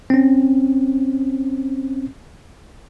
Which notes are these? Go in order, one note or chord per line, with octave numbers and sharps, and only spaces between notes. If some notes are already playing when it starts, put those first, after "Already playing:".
C4 C#4